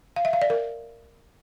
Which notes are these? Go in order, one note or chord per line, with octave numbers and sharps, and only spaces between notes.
F5
E5
F5
D5
A#4